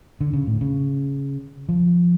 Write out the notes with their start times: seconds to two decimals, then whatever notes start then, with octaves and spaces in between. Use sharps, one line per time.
0.21 D3
0.33 C#3
0.47 A2
0.61 C#3
1.69 F3